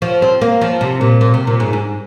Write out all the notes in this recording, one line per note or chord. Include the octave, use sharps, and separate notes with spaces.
F3
C4
A#3
F3
C3
A#2
A#2
C3
A#2
G#2
G#2